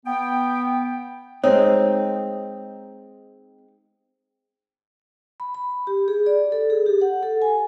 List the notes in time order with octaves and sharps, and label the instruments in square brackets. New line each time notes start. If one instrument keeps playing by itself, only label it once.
[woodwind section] B3 G5
[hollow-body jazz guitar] G#3 D#4 [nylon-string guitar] C4 [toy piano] C#5
[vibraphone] B5
B5
G4
G#4
D5
A4
G#4
G4
F#5
A4
G#5